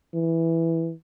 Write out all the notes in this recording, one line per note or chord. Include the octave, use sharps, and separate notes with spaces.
E3